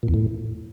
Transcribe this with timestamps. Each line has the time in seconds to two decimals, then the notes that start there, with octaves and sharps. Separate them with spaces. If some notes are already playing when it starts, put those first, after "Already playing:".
0.03 A#2
0.08 E2
0.14 A2